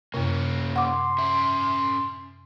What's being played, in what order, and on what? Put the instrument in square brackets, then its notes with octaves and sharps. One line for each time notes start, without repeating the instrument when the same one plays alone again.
[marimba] F#2 C3 [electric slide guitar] A#3 C#4
[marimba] F#5 D6 [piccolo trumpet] C6
[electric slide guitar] C#4 E5